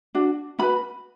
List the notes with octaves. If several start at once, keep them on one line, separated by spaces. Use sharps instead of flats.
D4 F#4
C#4 F#4 B4 B5